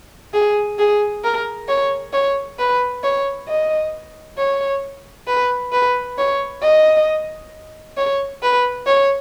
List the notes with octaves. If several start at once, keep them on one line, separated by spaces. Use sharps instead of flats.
G#4
G#4
A#4
C#5
C#5
B4
C#5
D#5
C#5
B4
B4
C#5
D#5
C#5
B4
C#5